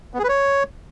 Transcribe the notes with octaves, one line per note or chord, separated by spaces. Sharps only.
B3
G#4
B4
C#5